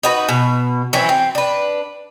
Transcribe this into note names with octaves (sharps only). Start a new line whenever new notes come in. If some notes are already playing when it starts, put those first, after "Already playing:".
D#4 F#4 B4
B2
E3 F#3 C4 C#4
C4
D4 B4